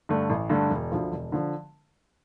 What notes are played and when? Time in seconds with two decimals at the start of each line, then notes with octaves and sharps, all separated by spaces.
0.09 G2 D3 A3
0.30 A1
0.49 G2 D3 A3
0.70 E1
0.92 D2 D3 F3
1.12 E1
1.32 D3 F3